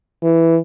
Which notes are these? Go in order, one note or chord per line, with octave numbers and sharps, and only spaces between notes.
E3